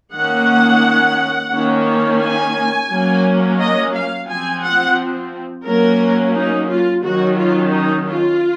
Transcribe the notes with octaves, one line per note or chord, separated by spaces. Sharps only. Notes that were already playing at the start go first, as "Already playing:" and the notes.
D#3 A#3 C#4 F#5
D#3 A#3 C#4
G#5
F#3 A#3 C#4
D#5
F5
F3 C4 G#5
F#5
F#3 A#3 C#4 A#4
D#4
F4
D#3 F#3 C#4 F#4
F4
D#4
F4